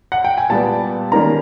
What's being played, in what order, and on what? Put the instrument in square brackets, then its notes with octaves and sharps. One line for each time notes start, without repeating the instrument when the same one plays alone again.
[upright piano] F#5
G5
G#5
A#2 G3 B3 A5
D#3 G3 A#3 C#4 A#5